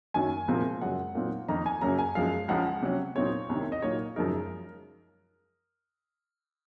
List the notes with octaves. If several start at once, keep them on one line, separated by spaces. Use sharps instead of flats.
F#2 D#3 F#3 A#3 G#5
C2 A#2 F3 G#3 C4
F#2 C#3 G#3 F#5
A#2 F#3 C4 D#4
F2 D#3 A#3 D#4 A#5
G#5
F#2 C#3 F#3 A#3 A#5
G#5
F#2 F3 G#3 F5
C#2 C#3 F3 G#3 F#5
C3 F#3 C#4
A#2 F#3 C4 D#4 C#5
C2 C3 D#3
D#5
A#2 F#3 A#3 D#4 C#5
F#2 C#3 F3 G#3 D#4 A#4